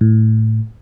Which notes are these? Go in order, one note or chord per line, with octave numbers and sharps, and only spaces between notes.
A2